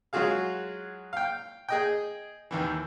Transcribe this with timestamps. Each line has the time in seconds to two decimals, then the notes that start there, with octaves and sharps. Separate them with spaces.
0.13 F#3 G#3 F4 F#4 G#4 F5
1.13 F5 G5
1.69 G#4 D#5 G5
2.51 D#2 D#3 E3